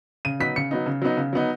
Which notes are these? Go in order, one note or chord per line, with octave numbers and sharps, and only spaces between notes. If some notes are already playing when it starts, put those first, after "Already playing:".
C#3 D#7
F#3 B3 D#4 B6
C#3 C#7
F#3 B3 D#4
C#3
F#3 B3 D#4
C#3
F#3 B3 D#4